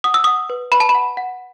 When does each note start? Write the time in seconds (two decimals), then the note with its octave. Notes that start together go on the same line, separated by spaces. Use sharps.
0.04 F#5 D#6
0.14 E6
0.24 F#5 D#6
0.50 B4
0.72 B4 B5
0.80 A5
0.89 B5
0.95 F#5
1.17 F#5